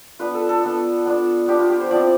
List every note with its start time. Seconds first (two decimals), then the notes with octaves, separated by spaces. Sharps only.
0.19 B3 D4 F4 B4
0.34 A4
0.49 A4
0.63 B3 D4 F4
1.06 B3 D4 F4
1.48 B3 D4 F4 G4
1.59 F4
1.70 G4
1.80 C5
1.91 F3 C4 E4 D5